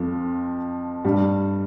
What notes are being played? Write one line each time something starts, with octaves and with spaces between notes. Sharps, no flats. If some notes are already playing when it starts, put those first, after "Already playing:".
Already playing: F2 F3
G2 G3